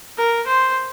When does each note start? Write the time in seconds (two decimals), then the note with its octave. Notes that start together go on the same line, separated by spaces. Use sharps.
0.18 A#4
0.47 C5